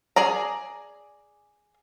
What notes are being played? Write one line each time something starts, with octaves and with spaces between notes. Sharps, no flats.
G#4 D5 A#5